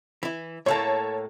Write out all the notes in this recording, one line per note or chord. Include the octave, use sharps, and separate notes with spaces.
E3 E4
A2 A3 A#3 C#5 A5